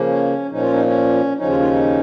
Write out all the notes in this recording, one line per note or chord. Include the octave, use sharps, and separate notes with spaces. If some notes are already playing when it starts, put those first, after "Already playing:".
Already playing: C#3 F3 A#3
C#4
A#2 F3 C#4 D#4
F4
D#4
C#4
D#2 C#3 F3 C#4 D#4
F4
F4
D#4